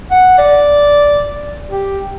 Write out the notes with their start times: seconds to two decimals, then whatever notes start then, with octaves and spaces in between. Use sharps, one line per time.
0.11 F#5
0.38 D5
1.70 G4